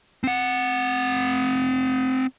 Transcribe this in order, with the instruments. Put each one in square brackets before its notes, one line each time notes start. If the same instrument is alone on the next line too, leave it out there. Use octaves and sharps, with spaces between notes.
[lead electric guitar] C4 F#5